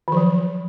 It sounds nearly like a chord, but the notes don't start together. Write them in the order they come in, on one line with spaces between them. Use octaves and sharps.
D#3 F3 F#3